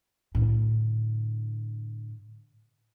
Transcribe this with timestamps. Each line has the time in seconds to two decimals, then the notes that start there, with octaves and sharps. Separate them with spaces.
0.35 A2 D3